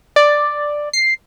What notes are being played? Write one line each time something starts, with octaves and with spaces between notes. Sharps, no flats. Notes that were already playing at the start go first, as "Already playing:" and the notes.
D5
C7